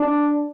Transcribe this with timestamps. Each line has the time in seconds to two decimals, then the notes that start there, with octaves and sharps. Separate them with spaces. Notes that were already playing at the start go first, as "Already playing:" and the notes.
Already playing: D4